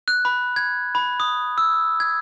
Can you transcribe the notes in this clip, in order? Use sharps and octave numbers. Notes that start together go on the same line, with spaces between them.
F#6
B5
G#6
B5
D#6
E6
G#6